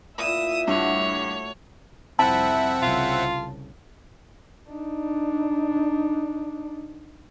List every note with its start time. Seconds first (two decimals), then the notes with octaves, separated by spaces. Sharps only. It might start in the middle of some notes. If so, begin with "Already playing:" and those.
0.18 A#2 E4 E5 D#6 E7
0.68 G2 A3 F#4 C#5 F#5
2.19 C2 F2 C4 E4 E5 F#5 A5
2.82 C2 C#3 F4
4.69 D4 D#4